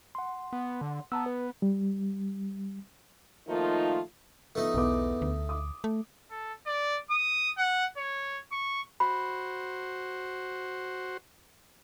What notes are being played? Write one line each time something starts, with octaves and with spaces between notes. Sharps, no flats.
F#5 C6
B3
D3
B3 A5 A#5 E6
B4
G3
D#3 F3 A3 A#3 D#4 F4
F3 A3 B3 D#4
B1 E2 B3 D6
D2
D6 D#6
A3
A4
D5
D#6
F#5
C#5
C#6
F#4 C5 B5